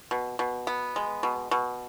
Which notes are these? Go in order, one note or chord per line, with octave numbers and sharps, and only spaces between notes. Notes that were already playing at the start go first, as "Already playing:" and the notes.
B2
B2
B3
G#3
B2
B2